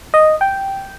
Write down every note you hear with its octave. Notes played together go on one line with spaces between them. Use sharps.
D#5
G5